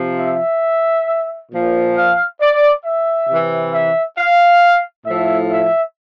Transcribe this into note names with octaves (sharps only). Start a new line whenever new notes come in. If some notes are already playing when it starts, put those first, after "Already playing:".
Already playing: C3 F3
E5
A#2 F3
F5
D5
E5
C3 E3
E5
F5
A2 F3 E5
E5